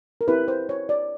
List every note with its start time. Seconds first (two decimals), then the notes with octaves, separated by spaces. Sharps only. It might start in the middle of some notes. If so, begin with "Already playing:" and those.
0.21 A#4
0.28 C4 E4 G4 B4
0.48 C5
0.69 C#5
0.89 D5